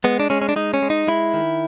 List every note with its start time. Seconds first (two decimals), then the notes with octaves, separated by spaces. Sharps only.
0.04 G#3 B3
0.20 D4
0.30 G#3 C#4
0.42 C#4
0.49 D4
0.56 G#3 D#4
0.74 C#4
0.82 G#3
0.90 D#4
1.07 G#3 E4
1.34 D#3